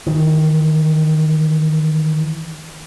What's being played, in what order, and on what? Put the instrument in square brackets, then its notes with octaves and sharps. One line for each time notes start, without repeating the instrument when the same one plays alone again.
[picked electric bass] D#3 E3